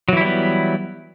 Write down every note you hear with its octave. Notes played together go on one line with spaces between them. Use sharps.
E3 F#3 G3 B3 E4